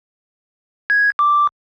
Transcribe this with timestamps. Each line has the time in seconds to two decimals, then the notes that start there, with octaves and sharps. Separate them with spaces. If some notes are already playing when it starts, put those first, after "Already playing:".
0.90 G#6
1.19 D6